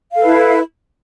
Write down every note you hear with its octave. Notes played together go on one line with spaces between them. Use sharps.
E4 A4 B4 F5